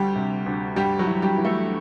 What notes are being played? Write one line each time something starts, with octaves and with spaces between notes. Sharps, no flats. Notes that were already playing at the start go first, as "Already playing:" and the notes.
Already playing: D2 G3 G4
C3
D2
G2 G3 G4
F#3 F#4
E3
G3 G4
E3
A3 A4